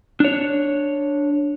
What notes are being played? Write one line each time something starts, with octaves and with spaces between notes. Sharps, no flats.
D4 C#5